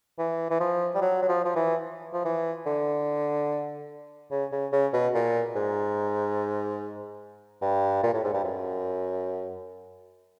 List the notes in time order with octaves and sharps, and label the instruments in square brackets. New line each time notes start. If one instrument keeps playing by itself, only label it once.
[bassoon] E3
E3
F3
G3
F#3
F#3
F3
F3
E3
F3
E3
D3
C#3
C#3
C#3
B2
A#2
G#2
G2
A#2
A2
G#2
G2
F#2